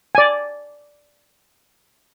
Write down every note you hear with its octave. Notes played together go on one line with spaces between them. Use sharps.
D5 G#5